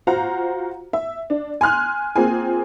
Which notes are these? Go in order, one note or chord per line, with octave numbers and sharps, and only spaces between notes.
F4 F#4 C5 F5 F#5 A#5
E5
D4
G#5 C6 F6 F#6
A#3 C4 F4 G#4 G#5